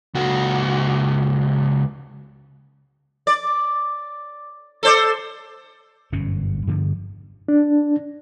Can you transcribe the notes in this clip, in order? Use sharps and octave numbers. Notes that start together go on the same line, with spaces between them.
C#2 F#4
D5
A4 C5 D5
G1 F#2 B2 C#4
G2 D3 F3
D4